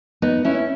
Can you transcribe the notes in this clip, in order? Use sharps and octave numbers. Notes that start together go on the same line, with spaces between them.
B3 D#4
C#4 E4